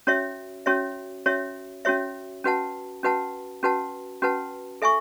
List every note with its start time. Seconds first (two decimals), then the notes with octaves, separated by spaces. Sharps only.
0.07 C#4 F#4 C#5 E5
0.66 C#4 F#4 C#5 E5
1.26 C#4 F#4 C#5 E5
1.85 C#4 F#4 C#5 E5
2.44 C#4 F#4 B4 F#5 A5
3.03 C#4 F#4 B4 F#5 A5
3.63 C#4 F#4 B4 F#5 A5
4.22 C#4 F#4 B4 F#5 A5
4.82 A4 E5 G#5 C#6